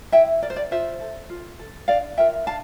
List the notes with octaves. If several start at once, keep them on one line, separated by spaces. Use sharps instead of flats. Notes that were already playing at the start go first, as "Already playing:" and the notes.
E4 E5 G5
A#4 D5
C5
D5
F4 C5 E5
A4
F4
A4
D4 D5 F5
F4 A#4 E5 G5
D4 F5 A5